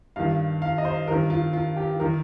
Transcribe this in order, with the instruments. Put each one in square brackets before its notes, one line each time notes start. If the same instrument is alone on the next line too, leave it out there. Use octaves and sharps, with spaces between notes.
[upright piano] G2 D#3 F5
F5
D#5
C5
G2 D#3 A#4
F4
F4
G4
D#3 A#4